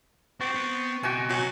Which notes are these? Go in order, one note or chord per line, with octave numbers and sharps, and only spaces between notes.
C4 F#4 G4 C#6 A6
B3
B2 C4 F#4 G5 G#5 A6 C#7 D7
F#3 F#4 G#5